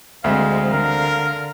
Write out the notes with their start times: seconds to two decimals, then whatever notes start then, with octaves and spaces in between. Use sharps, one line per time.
0.24 D2 G#3 C4 E5 F5
0.73 D3 A#4